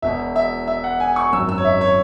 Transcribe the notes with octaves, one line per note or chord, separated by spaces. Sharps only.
E1 E2 B2 E5
E5
E5
F#5
G#5
C#6
G#1 F#2 F#3 E6
E6
C#5
E5
C#5